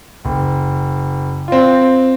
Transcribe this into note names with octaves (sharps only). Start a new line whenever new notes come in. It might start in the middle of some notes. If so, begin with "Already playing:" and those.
F#1
C4 F4